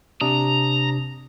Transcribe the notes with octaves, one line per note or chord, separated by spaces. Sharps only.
C3 D4 A#5 D#6